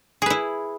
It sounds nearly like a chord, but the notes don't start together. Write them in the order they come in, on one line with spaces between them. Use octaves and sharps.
G#4 B4 E4